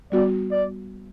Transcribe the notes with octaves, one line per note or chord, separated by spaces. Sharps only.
G3 B3 F#4 D5
D5